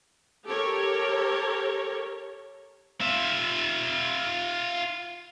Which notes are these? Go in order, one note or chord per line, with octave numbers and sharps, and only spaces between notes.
G4 A4 A#4 C#5
F4 E5